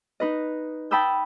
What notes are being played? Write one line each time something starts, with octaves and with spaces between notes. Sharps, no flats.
D#4 B4 D#5
G5 A5 B5 D#6 E6 G6